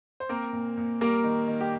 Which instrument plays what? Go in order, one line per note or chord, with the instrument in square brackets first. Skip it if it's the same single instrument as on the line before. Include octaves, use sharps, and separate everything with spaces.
[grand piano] C5
A#3 C4 A#4
A#2
A#2
G3 A#3 A#4
D#3
D#3
G4